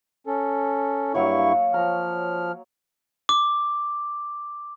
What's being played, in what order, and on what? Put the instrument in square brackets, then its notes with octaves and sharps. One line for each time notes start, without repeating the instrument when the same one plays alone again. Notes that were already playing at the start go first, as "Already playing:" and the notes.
[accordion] C#4 A4
[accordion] G2 E4 C#6 [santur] F#3 A#3 C#5
[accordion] F3 F6 [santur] A#5
[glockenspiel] D6